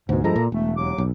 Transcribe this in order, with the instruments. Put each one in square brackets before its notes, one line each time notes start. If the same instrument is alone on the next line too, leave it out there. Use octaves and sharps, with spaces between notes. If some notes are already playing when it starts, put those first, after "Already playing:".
[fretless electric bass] D2 B2 [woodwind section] G#2
[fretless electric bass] G2 F3 G#3 [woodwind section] E4 A4 A#5
[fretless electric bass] A#2
[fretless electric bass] E1 [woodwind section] A3
[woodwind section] D#2 F#3 D6
[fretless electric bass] B1